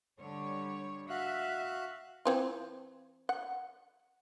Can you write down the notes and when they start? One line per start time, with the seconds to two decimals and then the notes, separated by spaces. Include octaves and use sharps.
0.21 D3 G3 C#5
1.10 F#4 E5 F5 F#6
2.25 E3 C4 F4
3.29 F#5